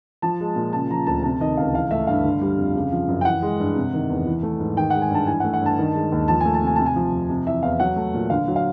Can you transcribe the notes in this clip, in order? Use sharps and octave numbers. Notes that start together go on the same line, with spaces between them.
F3 A5
G#3
A#2
C#3 A5
F3 A#5
D2 A5
C3 A5
D#3 D#5
C#2 F5
E3 F5
A3 E5
G2 F5
D3
G3
F2
C#3
F3
F#2
G5
E3 F#5
G#3
G2
C3
D#3
E2
E3
A3
G#2
D#3 G5
F#5
G#3
G#5
G2 A5
E3 G#5
A3 F#5
F#5
G2 A5
D#3
G#3
D#2
F3 A5
G#5
A3
A5
C3 G#5
C3 A5
G#5
F3
F2
C3
E3 E5
E2 F5
F#3 F#5
A3
A#2
D3 F5
F#3
F5